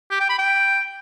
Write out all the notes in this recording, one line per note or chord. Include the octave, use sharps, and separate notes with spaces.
G4
G5
B5
G5